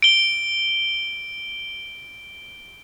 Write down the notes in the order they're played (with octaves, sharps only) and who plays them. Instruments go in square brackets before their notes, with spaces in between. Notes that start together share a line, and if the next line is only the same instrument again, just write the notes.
[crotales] D7 G7